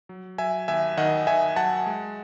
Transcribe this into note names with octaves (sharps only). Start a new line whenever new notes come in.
F#3
F#3 E5 G#5
D#2 E5 G#5
D#3 D#5 F#5
D#3 E5 G#5
F#3 F#5 A5
G#3